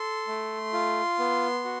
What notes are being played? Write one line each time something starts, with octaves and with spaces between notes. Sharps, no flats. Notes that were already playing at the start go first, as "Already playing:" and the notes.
Already playing: A4 C6
A3
F4
B3
F#4